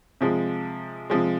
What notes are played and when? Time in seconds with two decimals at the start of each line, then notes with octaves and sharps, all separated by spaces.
0.21 C3 F3 G#3
1.10 C3 F3 G#3